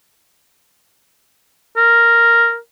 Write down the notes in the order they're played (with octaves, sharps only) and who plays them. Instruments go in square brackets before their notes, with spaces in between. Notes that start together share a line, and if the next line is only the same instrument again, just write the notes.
[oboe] A#4